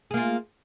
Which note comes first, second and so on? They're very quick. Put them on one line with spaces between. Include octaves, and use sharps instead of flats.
G#4 A#3 F4